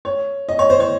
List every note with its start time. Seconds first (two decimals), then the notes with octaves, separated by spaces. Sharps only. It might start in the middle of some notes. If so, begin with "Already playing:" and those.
0.05 C#5
0.49 D#5
0.59 C#5
0.70 C5
0.80 C#5